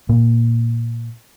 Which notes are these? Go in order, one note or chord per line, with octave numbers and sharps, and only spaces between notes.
A#2 A#3